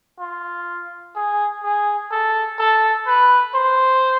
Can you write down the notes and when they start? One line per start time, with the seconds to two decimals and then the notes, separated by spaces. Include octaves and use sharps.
0.19 F4
1.16 G#4
1.64 G#4
2.11 A4
2.59 A4
3.07 B4
3.54 C5